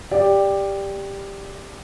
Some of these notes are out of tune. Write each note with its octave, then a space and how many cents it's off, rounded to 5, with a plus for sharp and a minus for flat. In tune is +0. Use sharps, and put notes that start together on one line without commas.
G4 +10 D5 +0